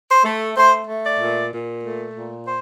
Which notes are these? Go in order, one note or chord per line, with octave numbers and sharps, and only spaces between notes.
C5
A3
A3 C5
A3
D5
A#2
A#2
A3
A#2
C5